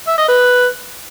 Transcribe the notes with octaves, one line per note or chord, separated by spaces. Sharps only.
E5
D#5
B4